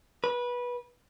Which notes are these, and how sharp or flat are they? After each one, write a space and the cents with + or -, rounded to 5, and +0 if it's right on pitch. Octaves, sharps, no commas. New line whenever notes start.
B4 -20